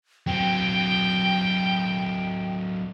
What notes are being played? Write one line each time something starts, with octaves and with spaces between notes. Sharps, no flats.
F#3 C4 G5